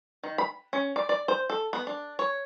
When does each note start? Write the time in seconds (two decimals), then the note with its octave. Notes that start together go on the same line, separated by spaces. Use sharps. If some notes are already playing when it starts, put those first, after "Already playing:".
0.23 D#3
0.38 B5
0.73 C#4
0.96 D5
1.09 D5
1.28 C5
1.50 A4
1.73 B3
1.87 D4
2.19 C#5